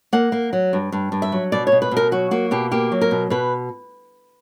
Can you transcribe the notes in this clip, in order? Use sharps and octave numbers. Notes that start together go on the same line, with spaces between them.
A#3 F#5
A#3
F#3
G2
G2
G2
E5
F#3
B2 D5
C#5
B2
B4
B2
A#4
F#3 F#4
A#3 F#4
B2 G4
A#3 G4
F#3
A#4
B2
B2 B4